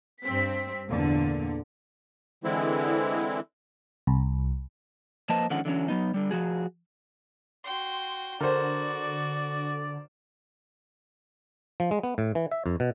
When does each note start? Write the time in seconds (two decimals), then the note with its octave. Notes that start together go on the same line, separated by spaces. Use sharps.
0.24 G2 C4 B6
0.89 E2 A#2 D3
2.44 D3 E3 G#3 C4 E4
4.07 C2
5.29 F3 A#3 B4 C5 D#5 A5
5.50 D3 D#3 F3 G#3 C#4 F#5
5.65 D3 E3 F#3 C#4
5.88 F#3 B3 D#4
6.14 D3 G3
6.31 F3 F#4 G#4
7.64 F#4 G5 C6
8.41 D3 F#4 A#4 C5 D5
11.80 F3
11.91 G#3
12.03 B3
12.18 A2
12.35 E3
12.51 E5
12.66 F2
12.80 B2